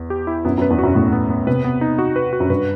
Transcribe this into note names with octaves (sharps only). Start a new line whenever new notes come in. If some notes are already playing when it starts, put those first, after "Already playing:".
Already playing: E2
G4
E4
F#2 B3
F#2
B4
E2
F#2 F#4
A2 B3
B3
B3
C3 B4
B3
D#4
F#4
B4
F#4
F#2
G2 B4